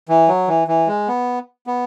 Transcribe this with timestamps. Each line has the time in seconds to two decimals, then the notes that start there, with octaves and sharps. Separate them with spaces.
0.09 E3
0.28 F#3
0.48 E3
0.68 E3
0.87 G#3
1.08 B3
1.67 B3